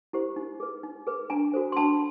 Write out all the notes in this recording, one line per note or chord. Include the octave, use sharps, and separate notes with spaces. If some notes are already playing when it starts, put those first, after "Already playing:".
E4 G4 C5
D#4
G#4 B4
D#4
G#4 B4
D4 G#5 A#5
F#4 A4 C5
C6
D4 A5 B5